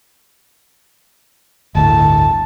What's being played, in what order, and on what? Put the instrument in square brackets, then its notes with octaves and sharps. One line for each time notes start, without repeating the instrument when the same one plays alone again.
[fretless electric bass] G1 D2 A2 [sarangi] A5